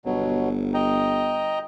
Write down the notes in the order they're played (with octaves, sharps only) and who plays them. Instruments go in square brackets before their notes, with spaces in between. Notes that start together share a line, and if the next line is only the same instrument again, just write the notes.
[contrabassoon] G1 [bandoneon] B2 F#3
[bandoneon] D#5 G5 A#5